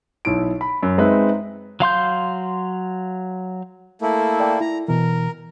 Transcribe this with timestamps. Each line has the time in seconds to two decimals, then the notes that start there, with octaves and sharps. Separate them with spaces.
0.25 B1 E4 D7
0.61 B5
0.83 F#2
0.98 G#3 C4 D#4 B4 E5
1.80 F#3 F5 C6 G6
4.02 A3 A#3 E4
4.40 D5 E5 G5
4.61 E4 A#5
4.88 B2 E3 A#4